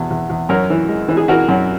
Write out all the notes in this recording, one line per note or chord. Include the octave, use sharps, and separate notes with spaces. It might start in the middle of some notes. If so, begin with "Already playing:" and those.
Already playing: E2 B2
E2
E2
F#2 A#4 C#5
E3
G#3
E3
G#4
E3 F#4 A#4
F#2